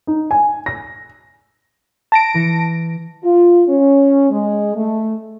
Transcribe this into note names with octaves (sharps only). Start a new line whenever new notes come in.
D#4
G#5
A#6
A5 A#6 D7
E3 C#7
F4
C#4
G#3
A3